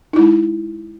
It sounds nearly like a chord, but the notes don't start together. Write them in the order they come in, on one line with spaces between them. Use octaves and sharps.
D#4 E4 G#3